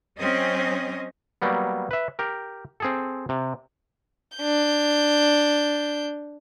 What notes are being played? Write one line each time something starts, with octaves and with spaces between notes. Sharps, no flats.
F#3 C4 C#4 D#5
F#3 G3 A#3 B3
B4 E5
G4 A#4
C4 G#4 A4
C3
D4 G6